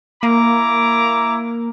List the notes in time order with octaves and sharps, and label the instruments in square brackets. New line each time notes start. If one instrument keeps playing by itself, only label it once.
[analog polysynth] A#3 [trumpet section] E4 A#5 D6